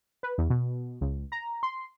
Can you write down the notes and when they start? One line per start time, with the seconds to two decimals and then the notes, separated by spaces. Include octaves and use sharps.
0.23 B4
0.38 E2
0.50 B2
1.01 C#2
1.32 A#5
1.63 C6